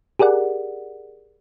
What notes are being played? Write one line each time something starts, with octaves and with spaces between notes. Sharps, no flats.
G4 G#4 A#4 D5 F#5